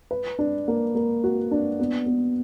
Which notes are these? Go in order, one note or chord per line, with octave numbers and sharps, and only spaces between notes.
B4
D4
A#3
A#3
F#4
D4
B3
B3